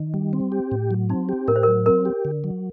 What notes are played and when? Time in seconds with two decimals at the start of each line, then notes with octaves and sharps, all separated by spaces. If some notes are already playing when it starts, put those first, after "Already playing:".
Already playing: D#3
0.14 G3
0.33 C4
0.52 G4
0.72 A2
0.91 F#3
1.10 C4 D#4
1.29 G4
1.48 A2 A#4
1.56 C5
1.63 F#3 A#4
1.86 C4 A#4
2.05 G4
2.25 D3
2.44 F#3